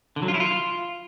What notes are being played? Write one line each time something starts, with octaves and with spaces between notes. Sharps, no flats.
D3
F#3
F4
E4
F4